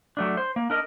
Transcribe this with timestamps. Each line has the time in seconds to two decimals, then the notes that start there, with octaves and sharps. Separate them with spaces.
0.17 F#3 A3 D4
0.37 C5
0.56 A#3
0.70 D4 A#4 D#5